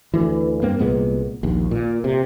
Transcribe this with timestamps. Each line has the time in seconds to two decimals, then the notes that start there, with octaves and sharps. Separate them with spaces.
0.14 D2 E3
0.62 G2 A#3 C4
0.79 C2 A#2 G#3 B3
1.43 A#1 D#2
1.71 A#2
2.04 C3